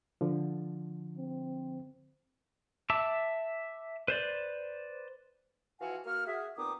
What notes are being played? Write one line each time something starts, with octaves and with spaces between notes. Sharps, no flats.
D3 F3
C4
E5 A5 D6 E6
B4 C5 D5
E3 F3 F#4 F5 F#5 G#5
A#3 F#4 F6
F#4 G#4 E5
A#2 B3 C4 D#4 D6 D#6